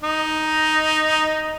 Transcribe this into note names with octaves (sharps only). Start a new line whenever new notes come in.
D#4